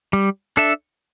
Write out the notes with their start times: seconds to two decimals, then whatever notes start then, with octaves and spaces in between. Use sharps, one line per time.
0.13 G3
0.57 D4 A4 E5